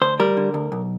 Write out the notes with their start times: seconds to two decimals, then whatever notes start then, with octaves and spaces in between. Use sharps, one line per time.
0.01 D2 C5
0.20 G3 A#4
0.37 D3
0.54 D2
0.72 B1